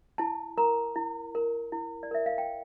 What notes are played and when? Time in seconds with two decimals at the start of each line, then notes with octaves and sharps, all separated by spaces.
0.18 E4 A5
0.58 A#4 A#5
0.96 E4
1.35 A#4
1.72 E4
2.03 D5
2.11 A#4 E5
2.26 F5
2.38 G5